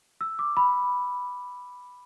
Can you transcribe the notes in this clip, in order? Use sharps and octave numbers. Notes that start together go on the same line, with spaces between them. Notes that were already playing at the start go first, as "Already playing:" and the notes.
E6
D6
B5